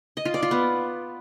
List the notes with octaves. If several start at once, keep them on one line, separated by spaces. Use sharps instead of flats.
D#5
F4
D5
F4
B3